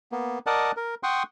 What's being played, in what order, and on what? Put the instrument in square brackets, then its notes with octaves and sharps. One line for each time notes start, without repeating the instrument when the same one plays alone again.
[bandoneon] A#3 B3
A#4 D5 D#5 F#5 A5
A#4
F#5 G5 C6 C#6 D#6